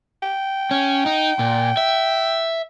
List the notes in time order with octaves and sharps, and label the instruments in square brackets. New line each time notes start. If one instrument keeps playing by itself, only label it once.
[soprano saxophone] G5
[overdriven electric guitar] C#4
D#4
A#2
E5